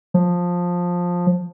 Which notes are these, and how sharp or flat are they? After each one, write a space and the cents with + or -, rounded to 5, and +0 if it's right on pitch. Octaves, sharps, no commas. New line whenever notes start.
F3 +15